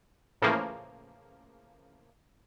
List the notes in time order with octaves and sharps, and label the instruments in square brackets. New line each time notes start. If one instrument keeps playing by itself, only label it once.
[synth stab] A2 C#3 E3 F3 A#3